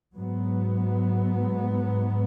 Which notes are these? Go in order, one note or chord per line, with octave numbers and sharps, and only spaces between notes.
G#2 F#3 B3